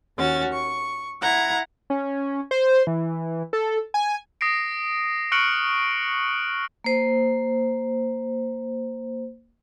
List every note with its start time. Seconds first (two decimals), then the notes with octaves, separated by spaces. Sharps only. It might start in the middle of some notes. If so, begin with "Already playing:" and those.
0.17 D#2 C#4 F#4 A6
0.53 C#6
1.22 E4 F#5 A#5 G#6
1.90 C#4
2.51 C5
2.87 E3
3.53 A4
3.94 G#5
4.41 D#6 A#6 C7 D7
5.32 C#6 F6 F#6 C#7 D7 F#7
6.84 A#3 C5